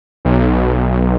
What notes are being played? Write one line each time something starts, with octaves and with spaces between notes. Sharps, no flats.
B1